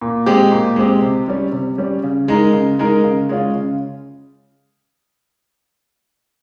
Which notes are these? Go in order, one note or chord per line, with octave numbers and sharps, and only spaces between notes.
A#2
G#3 C4 G4
A#2
G#3 C4 G4
C3
G3 C#4
C3
G3 C#4
C#3
G#3 D#4 A#4
C#3
G#3 D#4 A#4
C#3
G#3 C#4 F4
C#3